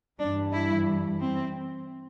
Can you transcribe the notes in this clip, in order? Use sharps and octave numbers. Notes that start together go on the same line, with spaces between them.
G2 E3 D4
E4
C4